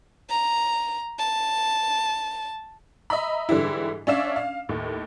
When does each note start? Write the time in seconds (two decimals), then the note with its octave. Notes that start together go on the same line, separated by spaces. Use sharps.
0.30 A#5
1.19 A5
3.10 D#5 E5 A#5 B5
3.49 G#2 D3 E3 G3 E4
4.07 C#4 D4 D5 E5 F5 E7
4.36 F5
4.69 D#2 A2